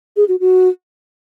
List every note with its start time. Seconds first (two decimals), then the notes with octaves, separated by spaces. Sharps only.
0.17 G#4
0.28 F#4
0.40 F#4